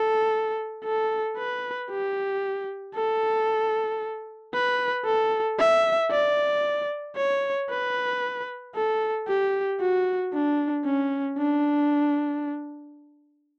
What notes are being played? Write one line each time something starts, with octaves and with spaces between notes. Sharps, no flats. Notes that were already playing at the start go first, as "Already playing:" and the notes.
Already playing: A4
A4
B4
G4
A4
B4
A4
E5
D5
C#5
B4
A4
G4
F#4
D4
C#4
D4